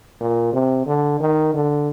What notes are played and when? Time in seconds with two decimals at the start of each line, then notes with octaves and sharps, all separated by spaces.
0.20 A#2
0.53 C3
0.86 D3
1.20 D#3
1.54 D3